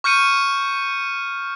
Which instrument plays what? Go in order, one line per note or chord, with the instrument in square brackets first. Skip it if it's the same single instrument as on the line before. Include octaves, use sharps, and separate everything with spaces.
[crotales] C#6 F6 G6 C#7 D#7